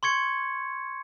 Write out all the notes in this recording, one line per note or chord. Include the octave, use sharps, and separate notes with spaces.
C6 C#6 G#6 C#7